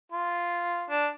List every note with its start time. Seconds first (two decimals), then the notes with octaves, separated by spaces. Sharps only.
0.12 F4
0.90 D4